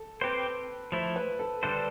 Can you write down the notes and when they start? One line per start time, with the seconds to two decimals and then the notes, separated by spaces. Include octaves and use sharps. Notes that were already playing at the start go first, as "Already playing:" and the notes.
Already playing: A4
0.21 C4 G4 B4 C5
0.92 F3 A3 E4 C5
1.16 B4
1.39 A4
1.63 D3 G3 D4 A4 B4 C5